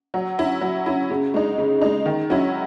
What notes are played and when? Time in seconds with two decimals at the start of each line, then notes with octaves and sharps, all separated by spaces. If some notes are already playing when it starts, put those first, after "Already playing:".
0.14 F#3
0.38 C#4 E4
0.61 F#3
0.86 C#4 E4
1.10 C#3
1.34 G#3 D#4
1.58 C#3
1.81 G#3 D#4
2.06 D#3
2.30 F#3 C#4 E4